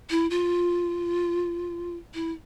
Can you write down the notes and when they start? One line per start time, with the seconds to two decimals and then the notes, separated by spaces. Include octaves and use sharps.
0.10 E4
0.30 F4
2.14 E4